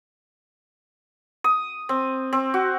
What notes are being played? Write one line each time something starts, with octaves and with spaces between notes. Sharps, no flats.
D#6
C4
C4
F#4